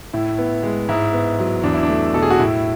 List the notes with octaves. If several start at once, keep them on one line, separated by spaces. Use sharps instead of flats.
A2 E4
B3
G#3
G#2 E4
B3
F#3
E2 D4
E4
D4
A3
B2 A4
G#4
F#4
A2 E4